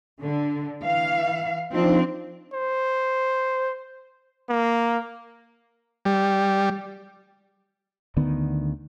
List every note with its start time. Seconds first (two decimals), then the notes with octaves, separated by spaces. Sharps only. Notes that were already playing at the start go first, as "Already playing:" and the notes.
0.22 D3
0.82 E3 F5
1.73 F3 C4 D4 D#4
2.53 C5
4.49 A#3
6.05 G3
8.17 D2 D3 D#3 B3